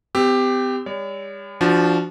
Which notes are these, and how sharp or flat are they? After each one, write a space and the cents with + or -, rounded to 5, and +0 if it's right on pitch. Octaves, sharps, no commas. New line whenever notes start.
C4 -45 G4 +10 E6 +0
G3 +45 C#5 +40
F3 -20 D4 +0 F#4 +0